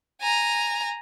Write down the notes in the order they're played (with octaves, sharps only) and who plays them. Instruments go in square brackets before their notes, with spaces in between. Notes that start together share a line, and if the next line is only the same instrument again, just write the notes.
[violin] G#5 A#5